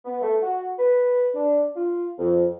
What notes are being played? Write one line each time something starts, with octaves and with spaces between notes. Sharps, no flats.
B3
A3
F#4
B4
D4
F4
F2